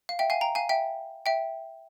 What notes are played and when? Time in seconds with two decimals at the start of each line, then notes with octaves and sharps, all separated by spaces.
0.09 F5
0.19 E5 G5
0.30 F5 G#5
0.41 G5 A#5
0.55 F5 G#5
0.69 E5 G5
1.26 E5 G5